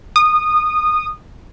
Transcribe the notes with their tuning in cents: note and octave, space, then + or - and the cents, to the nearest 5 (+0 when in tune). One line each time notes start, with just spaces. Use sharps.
D#6 -20